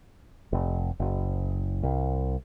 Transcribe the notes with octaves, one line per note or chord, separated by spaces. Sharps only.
F1
F#1
C2